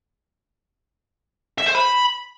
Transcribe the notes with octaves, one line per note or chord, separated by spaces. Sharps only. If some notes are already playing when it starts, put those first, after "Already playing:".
E5
C5
B5